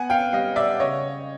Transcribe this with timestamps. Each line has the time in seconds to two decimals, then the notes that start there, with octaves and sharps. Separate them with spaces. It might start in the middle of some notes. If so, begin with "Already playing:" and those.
Already playing: B3 F#5 G#5
0.10 F5 G5
0.33 G3 D#5 F5
0.56 D5 E5
0.79 C#3 C#5 D#5